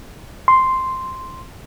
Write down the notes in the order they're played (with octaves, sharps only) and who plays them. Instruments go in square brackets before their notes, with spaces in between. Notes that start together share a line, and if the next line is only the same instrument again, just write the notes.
[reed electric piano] C6